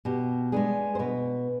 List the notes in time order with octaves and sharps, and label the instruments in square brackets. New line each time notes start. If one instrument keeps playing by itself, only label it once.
[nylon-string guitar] B2 G4
G#3 B3 D4 G#4
C5
B2 B4